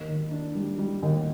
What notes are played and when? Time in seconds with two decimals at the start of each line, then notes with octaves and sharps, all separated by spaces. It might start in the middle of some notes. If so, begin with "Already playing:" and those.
Already playing: D#2
0.08 D#3
0.31 D4
0.55 G3
0.78 G3
1.02 D#2